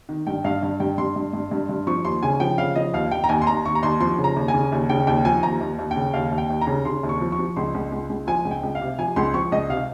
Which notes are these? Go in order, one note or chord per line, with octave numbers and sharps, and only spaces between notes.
D#3
G2 G5
G2 F5
G2
G2 G5
G2 C6
G2
G2
G2
G2
F3 C#6
D#2 C6
C#3 G#5
F3 G5
C#3 F5
F3 D#5
D#2 F5
D#2 G5
A#5
D#2 G#5
C6
D#2 A#5
D#2 C#6
A#5
D#2 C6
F3 C6
C#3
A#5
D#2
G#5
C#3
D#2
C#3 G5
D#2 G5
F3 G#5
D#2 A#5
D#2
D#2
G5
C#3
D#2 F5
D#2
G5
D#2
A#5
C#3
C#3 C6
D#2
C#6
F3
C#6
F3
C#2 C6
C#2
C#2
C#2
F3 G#5
C#2
G5
C#2
F5
C3
F3 G#5
C#2 C6
F3 C#6
C#2 D#5
C3 F5